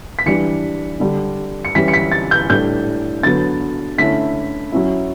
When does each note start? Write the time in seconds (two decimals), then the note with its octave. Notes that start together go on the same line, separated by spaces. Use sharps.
0.19 B6
0.26 E3 G3 D4 C#7
1.00 D3 G3 D4
1.65 C#7
1.75 E3 G3 C#4 E4 B6
1.88 C#7
1.94 B6
2.12 A6
2.31 G6
2.50 A2 G3 D4 G6
3.23 D3 F#3 B3 A6
3.98 D3 A3 C#4 E4 B6
4.72 F#3 C#4 E4